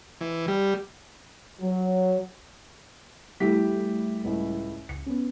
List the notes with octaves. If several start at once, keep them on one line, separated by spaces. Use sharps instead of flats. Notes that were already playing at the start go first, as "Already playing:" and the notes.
E3
G3
F#3
E3 G3 A3 E4 G4 B6
C#2 A2
C#2 C#7
B3 C#4